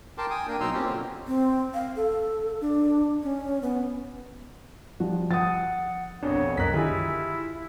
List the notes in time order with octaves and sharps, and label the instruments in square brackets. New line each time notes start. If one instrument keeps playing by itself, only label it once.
[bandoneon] A#4 G5 A5 C6 D6
G5 G#5 D#6
A#3 D4 A#4 G5
B2 F#3 D#4 A#5 C6 E6
A#3 C4 C#4 F4 G4
B2 D3
[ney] C4
F5
A4
D4
C#4
B3
[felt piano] F3 G3 [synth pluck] F#4
[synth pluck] F3 [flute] F#5 [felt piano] D#6 A6
[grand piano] A#1 F2 B2 [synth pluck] D4 [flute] C#5
[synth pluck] C2 F#2 D#5 [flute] A#4 [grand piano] F#6 B6
[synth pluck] D3 D#3 [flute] E4 [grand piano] F4 G#4 [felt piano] G4 G#5